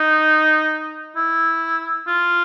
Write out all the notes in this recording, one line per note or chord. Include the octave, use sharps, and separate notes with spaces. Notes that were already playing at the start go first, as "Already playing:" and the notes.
Already playing: D#4
E4
F4